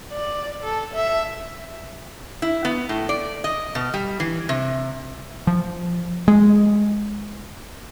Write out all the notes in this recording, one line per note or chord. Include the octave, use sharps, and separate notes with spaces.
D5
A4
E5
E4
B3
A2
D5
D#5
B2
G3
E3
C3
F3
G#3